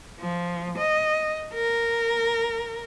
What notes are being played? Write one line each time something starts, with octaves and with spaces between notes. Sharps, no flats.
F3
D#5
A#4